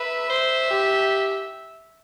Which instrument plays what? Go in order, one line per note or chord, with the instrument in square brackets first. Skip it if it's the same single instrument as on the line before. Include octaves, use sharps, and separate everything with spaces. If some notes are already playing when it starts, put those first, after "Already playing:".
Already playing: [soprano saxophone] B4 [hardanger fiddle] E5
[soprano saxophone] C5
G4